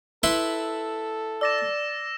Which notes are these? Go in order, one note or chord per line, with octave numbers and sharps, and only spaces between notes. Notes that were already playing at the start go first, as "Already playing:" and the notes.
E4 A4 B4 C6
D5 D6 E6 A6 A#6 E7